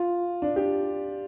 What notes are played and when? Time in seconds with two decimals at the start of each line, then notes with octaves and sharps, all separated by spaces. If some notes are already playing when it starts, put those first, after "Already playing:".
Already playing: F4
0.42 D4
0.56 G4